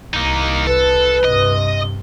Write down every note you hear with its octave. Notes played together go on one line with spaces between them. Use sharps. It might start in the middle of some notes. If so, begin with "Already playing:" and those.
C2 A#3 D#4
A4 B4
G2 C3 D#5